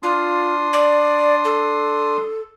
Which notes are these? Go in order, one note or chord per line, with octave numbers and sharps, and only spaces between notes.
D4 F4 C6 D#6
D5
A4